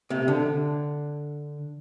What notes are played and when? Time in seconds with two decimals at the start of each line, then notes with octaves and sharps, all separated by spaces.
0.10 C3
0.28 D3